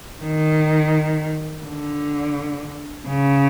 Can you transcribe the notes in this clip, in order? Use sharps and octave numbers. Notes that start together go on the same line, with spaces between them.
D#3
D3
C#3